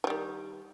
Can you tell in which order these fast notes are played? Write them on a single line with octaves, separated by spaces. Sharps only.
F3 G3 D#3